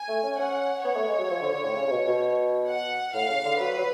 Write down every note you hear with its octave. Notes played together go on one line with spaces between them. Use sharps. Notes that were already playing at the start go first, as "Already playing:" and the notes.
Already playing: G#5
A3
C#4
C#4 F#5
B3 C#5
A3
G#3
F#3
F3
D3
D3
A2
C#3
C#3
B2
B2
F#5
A2 F5
C#3
D3
F#3 B4
F#3